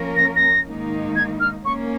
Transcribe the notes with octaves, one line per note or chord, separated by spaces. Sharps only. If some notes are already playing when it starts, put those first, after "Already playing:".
Already playing: F3 A#3 C#4 A#4
A#6
A#6
G#2 D#3 A#3 D#4
G#6
F6
A#3 C#4 C#6